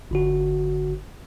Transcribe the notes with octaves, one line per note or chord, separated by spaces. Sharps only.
G1 D3 F#4